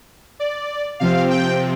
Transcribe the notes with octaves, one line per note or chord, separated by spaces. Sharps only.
D5
C3 F3 C4 F5
G5